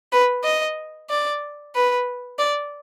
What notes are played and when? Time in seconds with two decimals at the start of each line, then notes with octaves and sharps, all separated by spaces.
0.12 B4
0.44 D#5
1.09 D5
1.75 B4
2.39 D5